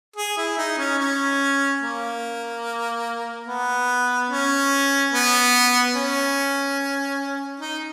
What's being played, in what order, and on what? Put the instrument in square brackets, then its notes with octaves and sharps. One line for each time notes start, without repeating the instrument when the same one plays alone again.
[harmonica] G#4
E4
D#4
C#4
C#4
A#3
B3
C#4
B3
C#4
D#4